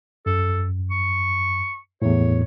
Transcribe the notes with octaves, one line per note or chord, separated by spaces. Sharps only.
F#2 A4
C#6
E2 A2 C#5